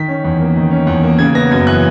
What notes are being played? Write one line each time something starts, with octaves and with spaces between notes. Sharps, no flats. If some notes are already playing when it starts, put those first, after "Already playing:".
Already playing: D#3 B6
C#4
E2
A#3
D#3
C#4
E2
A#3
C#3 G#6
B3 A#6
F#2 G#6
E3 F#6